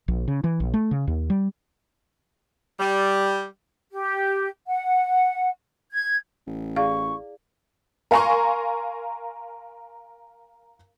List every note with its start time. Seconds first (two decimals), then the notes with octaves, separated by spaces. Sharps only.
0.08 A#1
0.28 C#3
0.44 E3
0.60 A#1
0.74 A3
0.91 C#3
1.07 D#2
1.30 G3
2.80 G3
3.92 G4
4.67 F#5
5.92 G#6
6.47 A1
6.76 E4 G#4 D5 F5 C#6
8.11 A#4 F5 G#5 A#5 C6 C#6